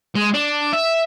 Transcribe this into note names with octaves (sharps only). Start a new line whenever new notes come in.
G#3
D4
E5